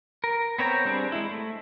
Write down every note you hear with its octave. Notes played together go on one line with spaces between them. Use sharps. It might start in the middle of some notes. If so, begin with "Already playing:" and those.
A#4
B3 C4 C#5 G5 A#5
G3 C4 D4 G#4
G#3 E4
A3